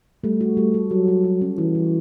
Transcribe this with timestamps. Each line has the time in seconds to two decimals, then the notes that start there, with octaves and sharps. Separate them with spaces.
0.24 G3 A3
0.41 F#4
0.57 G3
0.74 A4
0.91 F#3 A4
1.08 A4
1.24 F#4
1.41 C#4
1.58 E3 F#4
1.75 G3